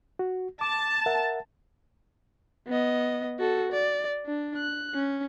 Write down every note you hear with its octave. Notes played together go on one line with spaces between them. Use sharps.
F#4
A5 D6
A#4 E5 F#5
B3 D#5
F#4 A4
D5
D4
F#6
C#4